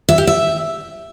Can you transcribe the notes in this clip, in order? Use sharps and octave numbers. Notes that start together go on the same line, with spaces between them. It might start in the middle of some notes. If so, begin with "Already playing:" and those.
E5
G4
E5